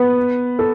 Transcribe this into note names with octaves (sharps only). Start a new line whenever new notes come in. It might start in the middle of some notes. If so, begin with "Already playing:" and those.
Already playing: B3 B4
A4